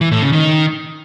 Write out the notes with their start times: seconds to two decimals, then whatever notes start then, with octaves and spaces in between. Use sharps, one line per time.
0.01 E3
0.11 A2
0.22 C#3
0.32 D#3